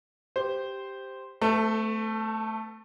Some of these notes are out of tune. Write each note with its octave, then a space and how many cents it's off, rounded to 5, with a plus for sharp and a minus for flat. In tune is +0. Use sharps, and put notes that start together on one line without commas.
G4 +0 C5 -5
A3 +0 C4 -45 A4 +30